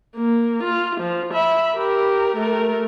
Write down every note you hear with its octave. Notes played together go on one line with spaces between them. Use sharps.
A#3
F4
F3
E5 B5
G4 A#4
A3 A#4